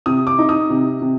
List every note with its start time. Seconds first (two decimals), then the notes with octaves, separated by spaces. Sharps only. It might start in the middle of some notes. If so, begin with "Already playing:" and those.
0.06 C3 D#6
0.27 D6
0.39 D#4
0.49 D#6
0.70 C3
1.01 C3